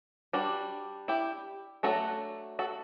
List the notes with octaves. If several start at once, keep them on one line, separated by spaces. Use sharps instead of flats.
G3 D4 F#4
E4 G4
F#3 A3 D4 F#4 A4
F#4 A4